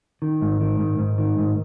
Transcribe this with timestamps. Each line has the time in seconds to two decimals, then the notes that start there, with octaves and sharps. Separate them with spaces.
0.22 D#3
0.42 G#2
0.61 D#3
0.79 G#2
0.99 G#2
1.18 D#3
1.39 G#2